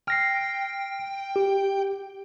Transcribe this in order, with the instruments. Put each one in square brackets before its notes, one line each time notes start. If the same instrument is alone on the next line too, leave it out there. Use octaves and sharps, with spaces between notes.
[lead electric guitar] G5 [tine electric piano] F6 A#6 C7
[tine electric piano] G4